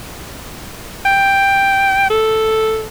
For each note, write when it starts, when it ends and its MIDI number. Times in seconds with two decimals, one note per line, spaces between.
1.05 2.09 79
2.10 2.87 69